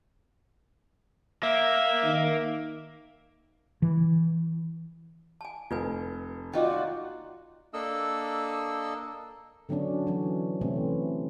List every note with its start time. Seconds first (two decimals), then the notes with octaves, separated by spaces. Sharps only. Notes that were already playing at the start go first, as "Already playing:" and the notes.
1.43 A#3 E5
2.04 D#3
3.82 E3
5.41 G#5 A5
5.71 F1 F4 B4 G#5
6.54 D#4 F4 F#4 D5 D#5 G5
7.73 A#3 D4 A4 D#5 E6
9.69 D3 F#3 B3 C#4 D4
10.07 E3 F#3 C#4
10.61 C3 E3 A3 C4 C#4